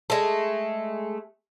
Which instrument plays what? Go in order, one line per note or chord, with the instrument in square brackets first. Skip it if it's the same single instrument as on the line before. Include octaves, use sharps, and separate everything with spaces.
[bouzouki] G#3 A3